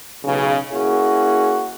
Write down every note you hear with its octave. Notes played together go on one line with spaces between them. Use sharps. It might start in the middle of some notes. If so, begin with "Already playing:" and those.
B1 C#3
A#3 C#4 E4 F#4 G#4